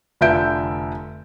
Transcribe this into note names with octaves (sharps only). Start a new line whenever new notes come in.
F1 D3 F4 E5 G6 D7